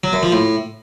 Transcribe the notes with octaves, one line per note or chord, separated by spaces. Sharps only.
F#3
F#2
F3
A2